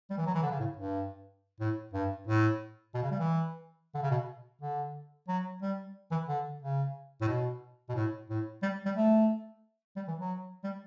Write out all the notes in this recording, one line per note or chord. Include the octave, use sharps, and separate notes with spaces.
G3
E3
F#3
E3
D3
C#3
A2
G2
A2
G2
A2
B2
C#3
G3
E3
D3
C#3
B2
D3
F#3
G3
E3
D3
C#3
A2
B2
B2
A2
A2
G3
G3
A3
G3
E3
F#3
G3